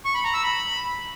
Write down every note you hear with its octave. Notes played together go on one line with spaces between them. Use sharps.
C#6
B5
A#5
E6
B5